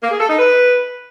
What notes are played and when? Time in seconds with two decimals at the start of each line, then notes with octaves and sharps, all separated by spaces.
0.02 A#3
0.11 G#4
0.20 A4
0.29 D#4
0.38 B4